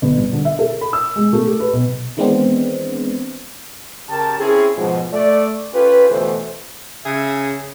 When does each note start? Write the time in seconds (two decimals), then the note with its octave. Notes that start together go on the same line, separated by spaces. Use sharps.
0.02 G1
0.18 G3
0.33 D3
0.45 E5
0.59 A4
0.81 B5
0.93 E6
1.16 G#3
1.33 A3
1.47 G4
1.60 B4
1.73 B1
2.17 D#3 E3 G#3 B3 C4 D4
4.10 C#3 G4 A#4 A5
4.39 C4 C#4 E4 G#4
4.78 G#2 B2 F3
5.13 A3 D5
5.74 C#4 F4 G4 A4 B4
6.09 D2 B2 E3 A3 C5
7.05 C#3 G#4 E5